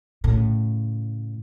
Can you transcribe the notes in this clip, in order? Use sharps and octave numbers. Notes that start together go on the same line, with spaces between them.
A2 C#3